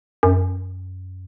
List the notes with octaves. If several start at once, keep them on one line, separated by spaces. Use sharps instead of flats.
F#2